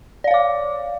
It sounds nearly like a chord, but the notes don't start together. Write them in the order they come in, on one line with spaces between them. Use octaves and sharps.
D5 F5 C#5 D6